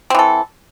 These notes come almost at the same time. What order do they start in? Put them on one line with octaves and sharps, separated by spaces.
C4 E3 A4